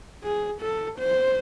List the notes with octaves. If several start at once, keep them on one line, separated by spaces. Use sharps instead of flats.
G#4
A4
C5